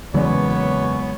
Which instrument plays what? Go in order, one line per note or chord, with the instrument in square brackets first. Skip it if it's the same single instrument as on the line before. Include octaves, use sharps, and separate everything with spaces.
[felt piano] F#1 E2 D5 [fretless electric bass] C#3 F#3 G#3 [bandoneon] B3 [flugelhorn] C#5